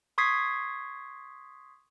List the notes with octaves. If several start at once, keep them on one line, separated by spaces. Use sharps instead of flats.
C6 C#6 D#6 G#6 B6 C7